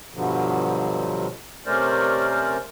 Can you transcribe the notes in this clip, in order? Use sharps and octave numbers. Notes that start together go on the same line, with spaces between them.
G2 B2 D3 F3 F#3
C3 A3 C#4 A#4 C5 D5